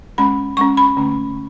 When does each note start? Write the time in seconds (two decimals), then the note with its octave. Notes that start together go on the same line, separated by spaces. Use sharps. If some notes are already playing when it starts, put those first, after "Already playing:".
0.18 G#3 C#4 B5
0.57 G#3 C#4 C#6
0.77 B5
0.96 D3 A3 C#4